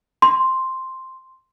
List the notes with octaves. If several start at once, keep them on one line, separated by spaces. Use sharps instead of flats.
C6